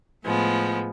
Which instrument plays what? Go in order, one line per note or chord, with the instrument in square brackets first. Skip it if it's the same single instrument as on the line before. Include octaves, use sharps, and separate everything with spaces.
[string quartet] A2 F3 G#3 B3